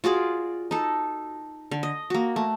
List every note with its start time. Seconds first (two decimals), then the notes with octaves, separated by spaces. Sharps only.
0.04 F4 F#4 G#4 D5
0.71 D#4 A4
1.71 D3
1.83 D#5
2.10 A#3 F#4
2.36 A3